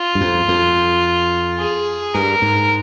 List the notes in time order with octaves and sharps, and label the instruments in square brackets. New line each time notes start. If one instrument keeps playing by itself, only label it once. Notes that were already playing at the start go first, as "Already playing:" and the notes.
Already playing: [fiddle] F4
[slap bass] G2
F2
F2
[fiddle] G#4
[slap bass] G2 [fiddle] A#4
[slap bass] G#2